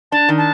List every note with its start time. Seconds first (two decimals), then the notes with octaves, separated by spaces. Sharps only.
0.12 D4 A5
0.29 D#3
0.37 A5